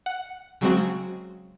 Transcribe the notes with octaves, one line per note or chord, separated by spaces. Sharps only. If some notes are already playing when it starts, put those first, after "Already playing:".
F#5
C#3 F#3 G#3 C4 F#4